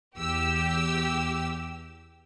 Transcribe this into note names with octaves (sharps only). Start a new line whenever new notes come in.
E2 G4 E6